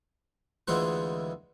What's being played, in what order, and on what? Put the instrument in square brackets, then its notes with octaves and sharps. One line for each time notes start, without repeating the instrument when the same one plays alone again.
[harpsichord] D2 E3 G#3 E4 F4 F#5